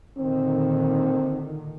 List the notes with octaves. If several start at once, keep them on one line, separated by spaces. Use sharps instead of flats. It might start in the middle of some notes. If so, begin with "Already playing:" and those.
A#2 D3 D#3 C4